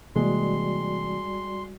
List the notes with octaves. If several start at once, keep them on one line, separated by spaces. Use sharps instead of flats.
C3 E3 G3 G#3 A#3 F#4 D5 C6